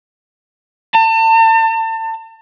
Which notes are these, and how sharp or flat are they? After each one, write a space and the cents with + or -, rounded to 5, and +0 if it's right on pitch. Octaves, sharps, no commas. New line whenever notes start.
A5 +35